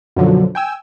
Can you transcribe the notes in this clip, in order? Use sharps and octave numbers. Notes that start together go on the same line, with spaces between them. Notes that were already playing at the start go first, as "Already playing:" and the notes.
F#2 B2 D3 F3 F#3
G5 G#5 E6